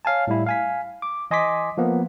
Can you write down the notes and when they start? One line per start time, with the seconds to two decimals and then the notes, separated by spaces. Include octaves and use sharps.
0.05 C#5 F5 G#5 A5
0.27 A2 G3 E4
0.47 F5 G#5 B6
1.02 D6
1.31 E3 D#5 G#5 C6 D6 B6
1.77 F3 A#3 B3